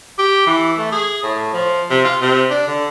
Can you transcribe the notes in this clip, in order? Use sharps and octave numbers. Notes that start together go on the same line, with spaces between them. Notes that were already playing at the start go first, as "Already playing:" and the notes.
G4
E3
A3
G#4
A2
F3
C3
F4
C3
D4
D3